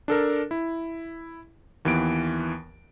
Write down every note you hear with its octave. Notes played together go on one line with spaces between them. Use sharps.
D4 A4 A#4
E4
D#2 E3 B3 D7